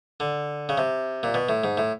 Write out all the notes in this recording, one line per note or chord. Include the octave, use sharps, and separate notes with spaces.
D3
C#3
C3
A#2
B2
A2
G#2
A2